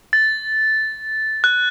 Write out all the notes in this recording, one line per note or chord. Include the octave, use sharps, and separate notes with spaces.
A6
F#6